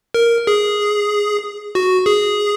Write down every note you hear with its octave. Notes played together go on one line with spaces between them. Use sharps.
A#4
G#4
F#4
G#4